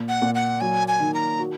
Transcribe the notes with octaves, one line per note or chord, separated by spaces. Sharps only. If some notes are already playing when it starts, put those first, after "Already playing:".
Already playing: A#2
F#5
A#2
F#5
F#3 G#5
G#5
D#3
A#5
F#4